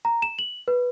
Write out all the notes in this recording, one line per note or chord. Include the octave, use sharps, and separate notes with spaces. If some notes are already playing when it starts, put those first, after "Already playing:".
A#5
E7
F#7
B4